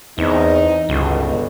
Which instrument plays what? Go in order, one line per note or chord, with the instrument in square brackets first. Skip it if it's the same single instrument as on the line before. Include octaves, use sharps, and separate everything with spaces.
[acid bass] E2 [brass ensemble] E3 C4 D#4
[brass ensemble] G1 B2 [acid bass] C#2